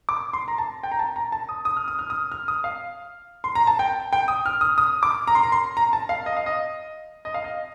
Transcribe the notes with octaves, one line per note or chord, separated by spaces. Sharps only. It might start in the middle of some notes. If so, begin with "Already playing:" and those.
D6
C6
A#5
A5
G5
A#5
A5
A#5
A5
D#6
D#6
F6
D#6
F6
D#6
F6
D#6
F5
C6
A#5
A5
G5
G5
D#6
F6
D#6
D#6
D6
A#5
C6
A#5
C6
A#5
A5
F5
D#5
F5
D#5
D#5
F5
D#5